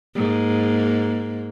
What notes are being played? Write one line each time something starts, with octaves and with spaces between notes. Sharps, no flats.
G#2 A#3